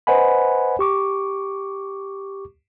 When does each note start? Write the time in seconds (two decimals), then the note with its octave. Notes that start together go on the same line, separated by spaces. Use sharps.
0.07 B4 C5 D#5 F#5 G#5 B5
0.79 G4 C#6 D6